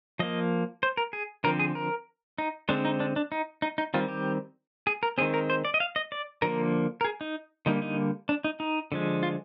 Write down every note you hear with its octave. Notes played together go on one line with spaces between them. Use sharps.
F3 A#3 D#5
C5
A#4
G#4
D3 F3 C4 A#4
G#4
A#4
D#4
D3 G#3 C4 D4
D#4
D4
D4
D#4
D#4
D#4
D#3 G3 C4 F4
G4
G#4
A#4
D#3 G#3 C4 G#4
A#4
C5
D5
D#5
F5
D#5
D5
D3 F3 A#3 A#4
A#4
G#4
D#4
D3 G3 A#3 D#4
D#4
D4
D#4
D#4
D3 F3 G#3
F4